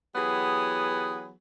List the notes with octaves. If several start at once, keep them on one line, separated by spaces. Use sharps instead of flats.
E3 F#3 B3 G4 G#4